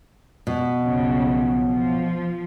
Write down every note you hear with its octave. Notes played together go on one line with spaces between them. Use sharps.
B2
B1 F2 C#3
F3